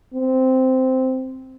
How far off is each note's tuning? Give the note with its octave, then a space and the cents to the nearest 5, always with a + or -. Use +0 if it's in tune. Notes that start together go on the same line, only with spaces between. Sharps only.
C4 -10